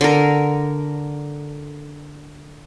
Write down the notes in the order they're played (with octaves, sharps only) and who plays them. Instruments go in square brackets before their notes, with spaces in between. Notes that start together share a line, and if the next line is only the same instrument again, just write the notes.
[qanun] D3 A#4